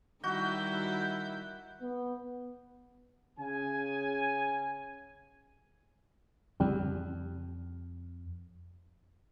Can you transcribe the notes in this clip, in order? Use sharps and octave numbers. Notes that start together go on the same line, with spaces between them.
D#3 G3 E4 F#4 G6
B3
C#3 G#5
A1 F2 C#3 G3